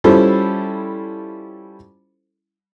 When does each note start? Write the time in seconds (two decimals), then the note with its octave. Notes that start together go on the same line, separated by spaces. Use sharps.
0.04 G3 C#4 E4 F4 A4 C5